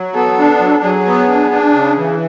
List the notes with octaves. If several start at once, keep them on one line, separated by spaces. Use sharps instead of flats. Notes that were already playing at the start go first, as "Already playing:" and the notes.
Already playing: F#3
B3 A4
D4
F#3
F#3 G#4
B3
D4
D4
C#3
E3